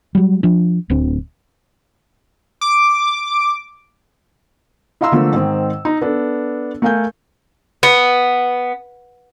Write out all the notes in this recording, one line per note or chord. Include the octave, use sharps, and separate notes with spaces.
F#3 G3
F3 D4
D1 D2 D3 C4
D6
E4 D#5 F5 A#5 C6 E6
D3 F3 A3 A#3
G#2 D#3 C4
D#4
B3 D4 A4
A3 A#4 F5 G#5 G6
B3